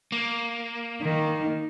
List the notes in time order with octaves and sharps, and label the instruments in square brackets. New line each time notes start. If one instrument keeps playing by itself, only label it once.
[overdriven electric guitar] A#3
[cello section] D#3